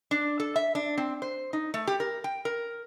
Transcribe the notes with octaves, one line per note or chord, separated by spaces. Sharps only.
D4
A4
E5
D4
C4
C5
D#4
A3
G4
A#4
G5
A#4